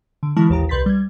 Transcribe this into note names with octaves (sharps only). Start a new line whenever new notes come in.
D3
E3 G#3 E4 A5 C#6 F6
A1 D#2 G4 A#5
C2 B4 C6 G6 A6 B6
G3 G#6